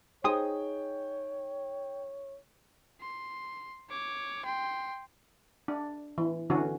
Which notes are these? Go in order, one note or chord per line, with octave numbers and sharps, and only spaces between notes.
D#4 G#4 C5 C#5 G5 D#6
C6
C#5 D6
G5 C6
D4
E3
D3 E3 C#4 F#4